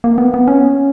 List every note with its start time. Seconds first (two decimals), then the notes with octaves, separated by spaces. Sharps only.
0.04 A#3
0.18 B3
0.34 B3
0.48 C#4